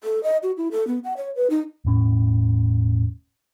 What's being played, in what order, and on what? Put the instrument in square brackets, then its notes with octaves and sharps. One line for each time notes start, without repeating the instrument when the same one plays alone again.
[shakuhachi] A4
D#5
F#4
E4
A4
B3
F#5
C#5
B4
D#4
[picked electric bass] E1 A2 C#4